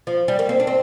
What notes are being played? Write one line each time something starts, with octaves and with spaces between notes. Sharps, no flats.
F3
G3
A#3
C4
D4
C4